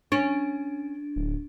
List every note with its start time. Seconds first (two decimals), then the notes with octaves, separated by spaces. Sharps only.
0.12 C#4 D4
1.16 D1